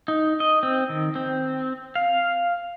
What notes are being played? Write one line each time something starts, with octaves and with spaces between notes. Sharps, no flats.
D#4
D#5
C4
D#3
C4
F5